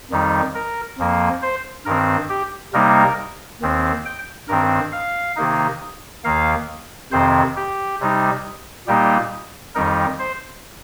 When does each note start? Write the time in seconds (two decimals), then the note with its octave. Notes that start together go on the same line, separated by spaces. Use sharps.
0.11 F2 D#3 G3 D#4
0.55 A#4
0.99 F2 F3 A#3
1.42 C5
1.86 G2 D#3 C4 A#4
2.29 G4
2.73 C3 G3 A#3 D#4 A#4
3.62 D#2 D#3 C4
4.05 G5
4.48 G2 D#3 C4 A#4
4.93 F5
5.36 C3 D#3 A#3 D#4
6.24 D#2 D#3 A#3 F5
7.12 F2 C3 D#3 C4 C5
7.56 G4
8.00 C3 G3 D#4
8.87 A#2 G3 A#3 D#4 G4
9.75 F2 D#3 G3 D#4 A#4
10.19 C5